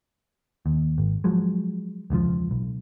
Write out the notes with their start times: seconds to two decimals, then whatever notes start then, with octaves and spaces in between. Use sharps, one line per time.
0.66 D#2
0.98 G#1
1.24 F3 F#3 G#3
2.10 E1 C#2 D3 F3
2.51 B1